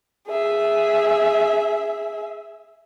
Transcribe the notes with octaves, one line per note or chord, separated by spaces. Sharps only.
G#4 E5